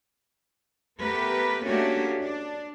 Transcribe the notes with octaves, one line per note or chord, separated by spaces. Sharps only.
A3 B3 G4 A#4 B4
A3 A#3 C#4 D4 F#4 G4
D4